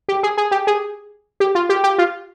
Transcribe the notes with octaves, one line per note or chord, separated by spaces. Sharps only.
G4
G#4
G#4
G4
G#4
G4
F4
G4
G4
F4